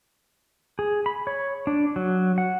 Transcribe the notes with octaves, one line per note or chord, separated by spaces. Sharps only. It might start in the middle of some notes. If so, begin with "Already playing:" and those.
G#4
B5
C#5
D4
F#3
F#5